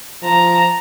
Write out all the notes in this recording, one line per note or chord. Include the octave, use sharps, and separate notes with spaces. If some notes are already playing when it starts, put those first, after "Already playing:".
F3 A5 A#5